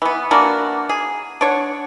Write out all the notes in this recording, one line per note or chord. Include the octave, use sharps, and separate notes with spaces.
E3 B3
E3 A#3 D4 F#4
G#4
D4 C#5 F#5